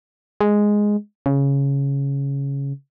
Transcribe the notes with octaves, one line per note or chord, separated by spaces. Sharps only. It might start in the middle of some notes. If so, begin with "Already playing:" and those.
G#3
C#3